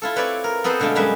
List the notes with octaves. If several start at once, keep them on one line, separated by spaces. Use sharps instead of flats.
E4 F4 A4
C4 B4 C#5 D5 B5
A#4
B3 C4 A4 B4 C5 D#5
B2 D3 G#3 A3 F4
F#2 G3 G#3 B4 E5